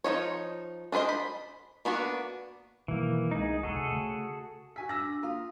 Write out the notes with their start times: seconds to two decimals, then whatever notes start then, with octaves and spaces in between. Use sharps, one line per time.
0.04 F3 F#3 D#4 C#5
0.92 D4 G#4 B4 C5 D#5
1.09 B5
1.85 A#3 B3 D4 F#4
2.88 B2 D#3 E3 F#3 A#3
3.31 C2 G#3 D#4 G#4
3.63 A#1 E2 F#4 G#4 A4
3.75 C3
3.92 C#3 A3
4.76 F#4 G#5 B6
4.89 D4 E6 A#6
5.23 A#3 F4 F5 D#6